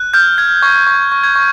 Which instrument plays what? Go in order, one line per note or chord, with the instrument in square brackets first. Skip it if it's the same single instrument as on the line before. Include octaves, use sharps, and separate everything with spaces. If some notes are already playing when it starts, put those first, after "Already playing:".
Already playing: [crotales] F#6
F6 G6
F6 G#6
C#6 G#6
C#6
C#6
G#6
C#6